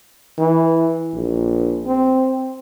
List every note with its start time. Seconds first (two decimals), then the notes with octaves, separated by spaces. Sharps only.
0.38 E3
1.14 A#1
1.86 C4